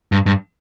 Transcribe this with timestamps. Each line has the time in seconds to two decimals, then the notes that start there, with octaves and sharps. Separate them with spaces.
0.12 G2
0.26 G2